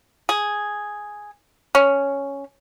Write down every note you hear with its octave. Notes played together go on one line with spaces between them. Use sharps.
G#4
C#4